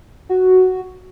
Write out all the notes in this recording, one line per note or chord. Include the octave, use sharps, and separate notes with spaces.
F#4